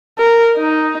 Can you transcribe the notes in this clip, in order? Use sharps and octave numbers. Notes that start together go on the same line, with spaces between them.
A#4
D#4